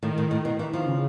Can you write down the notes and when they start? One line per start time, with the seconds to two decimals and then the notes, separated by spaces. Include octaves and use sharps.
0.03 A2 D#3
0.18 A2
0.31 A2
0.45 B2
0.59 E3
0.73 F3
0.86 C#3